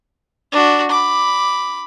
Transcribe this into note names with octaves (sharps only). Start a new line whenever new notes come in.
D4 F#4
B5 D6